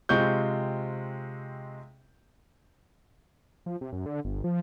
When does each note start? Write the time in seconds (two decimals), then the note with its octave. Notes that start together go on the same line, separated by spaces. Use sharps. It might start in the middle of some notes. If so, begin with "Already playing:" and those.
0.09 C3 G#3 C4 F4 C#6 G6
3.66 F3
3.81 C3
3.92 F#2
4.06 D3
4.25 G1
4.44 F3